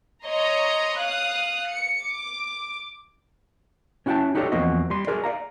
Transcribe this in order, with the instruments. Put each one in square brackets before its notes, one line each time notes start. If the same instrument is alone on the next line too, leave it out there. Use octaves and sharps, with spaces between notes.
[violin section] C#5 D#5 A#5 C6
F5 D#6 F#6
C#7
D6
[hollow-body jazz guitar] C#4 E4 F#4 F#5 G5 A5
D#4 F#4 G4 A4 C#5 D5
E2 F3 A#3 C4 F#4 D#5
G3 C6
F#4 G#4 A#4 D5
D5 D#5 F5 A#5